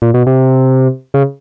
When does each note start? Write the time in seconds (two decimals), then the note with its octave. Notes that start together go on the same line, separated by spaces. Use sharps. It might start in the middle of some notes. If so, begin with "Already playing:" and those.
0.02 A#2
0.14 B2
0.27 C3
1.14 C#3